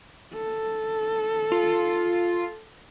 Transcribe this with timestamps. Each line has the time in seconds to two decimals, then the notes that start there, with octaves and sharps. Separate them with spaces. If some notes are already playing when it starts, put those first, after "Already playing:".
0.34 A4
1.52 F4